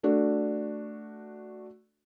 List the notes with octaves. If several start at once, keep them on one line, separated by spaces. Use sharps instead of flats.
A3 D4 F#4